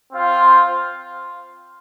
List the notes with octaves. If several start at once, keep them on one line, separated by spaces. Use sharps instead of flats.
C4 F4 C5 F5